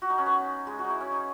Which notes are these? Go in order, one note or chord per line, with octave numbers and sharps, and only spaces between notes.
F#4
D#4
C#4
B3
G#3
F#4
D#4
E4
C#4
D#4